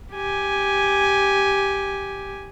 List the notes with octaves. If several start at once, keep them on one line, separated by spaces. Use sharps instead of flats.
G4 G#5